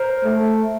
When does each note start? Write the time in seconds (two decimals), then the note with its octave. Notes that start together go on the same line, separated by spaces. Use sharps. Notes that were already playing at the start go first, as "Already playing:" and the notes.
Already playing: A#4 C5
0.24 A3